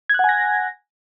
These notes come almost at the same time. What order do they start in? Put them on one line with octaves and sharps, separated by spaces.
G#6 F#6 F#5 G#5 A#6